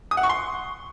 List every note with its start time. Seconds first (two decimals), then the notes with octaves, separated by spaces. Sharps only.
0.11 D#6
0.17 F#5
0.23 C#6
0.29 C6